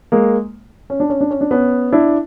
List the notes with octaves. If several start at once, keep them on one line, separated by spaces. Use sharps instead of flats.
G#3 A#3
C#4
D4
C#4
D4
C#4
D4
B3 C#4
D4 E4